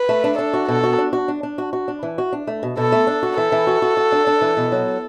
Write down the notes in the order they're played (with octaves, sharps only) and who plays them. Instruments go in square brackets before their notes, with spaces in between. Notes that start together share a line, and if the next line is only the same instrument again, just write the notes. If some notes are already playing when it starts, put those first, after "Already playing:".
Already playing: [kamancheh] B4
[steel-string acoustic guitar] A3
D4
[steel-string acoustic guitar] D4 [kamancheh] A4
[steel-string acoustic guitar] F#4
[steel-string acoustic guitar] B2 [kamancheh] A4
[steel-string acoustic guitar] F#4
D4
F#4
D4
D4
F#4
F#4
D4
E3
F#4
D4
A3
B2
[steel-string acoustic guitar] B2 [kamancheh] A4
[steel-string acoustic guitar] A3
D4
F#4
[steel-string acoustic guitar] E3 [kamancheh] A4
[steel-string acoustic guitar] E3
F#4
F#4
F#4
D4
D4
E3
B2
F#3